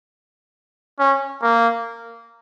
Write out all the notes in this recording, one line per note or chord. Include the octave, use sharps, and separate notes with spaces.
C#4
A#3